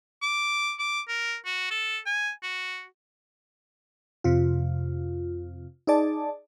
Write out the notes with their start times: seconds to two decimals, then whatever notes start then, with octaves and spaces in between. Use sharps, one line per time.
0.22 D6
0.79 D6
1.08 A#4
1.45 F#4
1.70 A4
2.06 G#5
2.43 F#4
4.24 F2 C3 F4
5.87 D#4 G#4 D5 A5